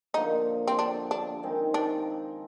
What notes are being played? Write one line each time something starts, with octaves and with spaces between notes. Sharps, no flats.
D3 F3 A#3 D#4
C4
D4
D4
D#3 G#3 C4 D#4
D4